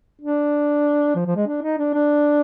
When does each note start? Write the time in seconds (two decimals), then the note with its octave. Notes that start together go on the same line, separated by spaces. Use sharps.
0.21 D4
1.15 F3
1.26 F3
1.36 G#3
1.47 D4
1.62 D#4
1.78 D4
1.94 D4